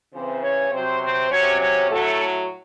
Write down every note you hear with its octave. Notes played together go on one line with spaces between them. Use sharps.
C#3 E3 C4 C5
C#4 C#5
C3 F#3 C4 C5
C4 C5
C3 F#3 C#4 C#5
C#4 C#5
A2 F#3 A3 A4